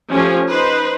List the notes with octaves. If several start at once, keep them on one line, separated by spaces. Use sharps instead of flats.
F3 A3 C#4 G4
D#4 B4 C5